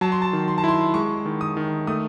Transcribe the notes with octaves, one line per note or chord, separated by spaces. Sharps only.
F#3 A5
C6
A5
D#3
C6
A5
E4 C6
G#3 C#6
D#3
D#6
D#3
A3 D#6